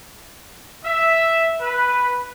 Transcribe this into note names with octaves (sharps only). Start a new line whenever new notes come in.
E5
B4